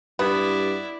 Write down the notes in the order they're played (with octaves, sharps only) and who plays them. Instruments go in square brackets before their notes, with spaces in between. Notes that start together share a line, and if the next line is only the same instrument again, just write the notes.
[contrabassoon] G2 [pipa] B3 [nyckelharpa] E4 D5